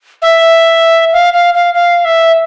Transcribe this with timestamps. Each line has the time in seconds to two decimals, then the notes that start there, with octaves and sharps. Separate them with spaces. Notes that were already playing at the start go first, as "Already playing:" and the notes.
0.22 E5
1.13 F5
1.34 F5
1.54 F5
1.74 F5
2.05 E5